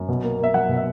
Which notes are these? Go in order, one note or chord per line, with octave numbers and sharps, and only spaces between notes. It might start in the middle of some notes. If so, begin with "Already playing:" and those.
Already playing: F#2
B2
A#3
A#3 E5
F#3 F#5
B2
E5